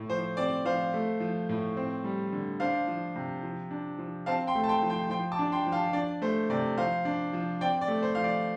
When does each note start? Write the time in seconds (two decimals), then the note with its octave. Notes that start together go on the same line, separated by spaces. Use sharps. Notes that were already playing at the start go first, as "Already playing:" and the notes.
Already playing: A2
0.09 F3 C5
0.37 C4 D5
0.65 F3 C5 F5
0.94 A3
1.20 F3
1.49 A2
1.77 C4
2.04 G3
2.33 D3
2.60 D4 C5 F5
2.87 F3
3.16 C3
3.43 F3
3.71 D4
3.99 F3
4.26 C4 F5 A5
4.47 G5 C6
4.55 A3
4.64 A5
4.69 G5 C6
4.83 F3
4.90 G5 C6
5.10 F3 G5 C6
5.32 A5 D6
5.39 D4
5.52 G5 C6
5.67 F3
5.72 F5 A5
5.93 D4 D5
6.22 A3 C5
6.50 C3 D5
6.78 F3 C5 F5
7.05 D4
7.33 F3
7.61 C4 D5 G5
7.81 D5
7.88 A3
8.02 C5
8.15 F3 F5
8.24 D5